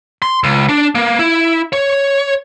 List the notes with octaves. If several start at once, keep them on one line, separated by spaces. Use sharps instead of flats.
C6
C#2
D4
A#3
E4
C#5